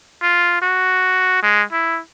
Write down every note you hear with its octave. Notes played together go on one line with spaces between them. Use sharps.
F4
F#4
G#3
E4